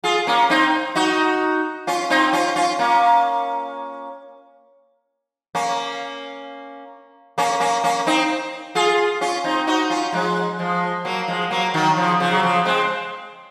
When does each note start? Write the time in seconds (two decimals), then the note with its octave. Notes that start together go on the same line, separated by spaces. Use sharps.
0.04 F4 G#4
0.27 A#3 C#4
0.50 C4 D#4
0.95 D#4 F#4
1.87 C#4 F4
2.10 C4 D#4
2.33 C#4 F4
2.56 C#4 F4
2.79 A#3 C#4
5.55 A#3 C#4
7.38 A#3 C#4
7.60 A#3 C#4
7.84 A#3 C#4
8.07 C4 D#4
8.75 F4 G#4
9.21 C#4 F4
9.44 C4 D#4
9.67 D#4 F#4
9.90 C#4 F4
10.12 F3 G#3
10.59 F3 G#3
11.05 F#3 A#3
11.28 F3 G#3
11.51 F#3 A#3
11.74 D#3 F#3
11.96 C#3 F3
12.20 C#3 F3
12.31 F#3
12.43 C#3 F3
12.65 G#3 C4